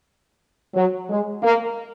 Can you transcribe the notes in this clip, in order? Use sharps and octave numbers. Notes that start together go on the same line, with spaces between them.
F#3
G#3
A#3